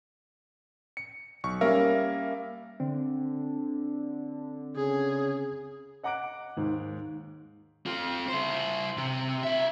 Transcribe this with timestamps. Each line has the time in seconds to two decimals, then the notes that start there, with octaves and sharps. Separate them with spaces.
0.97 C#7
1.44 B1 C#6
1.61 G3 A#3 C#4 A#4 E5 F5
2.80 D3 C4
4.76 C#3 G#4
6.03 D#5 F#5 A#5 D6 F#6 D7
6.57 D#2 G#2
7.86 C4 F4
8.28 E4 C5
8.97 C3
9.43 F4 E5